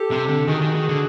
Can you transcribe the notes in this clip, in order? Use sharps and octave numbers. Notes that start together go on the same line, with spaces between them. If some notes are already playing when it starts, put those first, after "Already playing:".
Already playing: G4 A4
C3
D3
D#3 F#4 G#4
D#3
D#3
D3